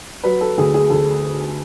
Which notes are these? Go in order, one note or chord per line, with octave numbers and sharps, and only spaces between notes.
F#3 B4
A4
D2 G#4
G#4
D2 A4